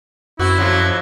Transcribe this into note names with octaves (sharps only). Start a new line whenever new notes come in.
F#2 C4 E4 F#4
F2 F3 F#3